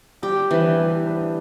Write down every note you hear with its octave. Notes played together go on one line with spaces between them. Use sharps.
G3 G4
E3 B3 D4 B4
G3
B3 D4 B4